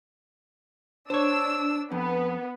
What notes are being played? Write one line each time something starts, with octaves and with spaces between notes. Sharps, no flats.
D4 C5 C#5 E6
F2 B3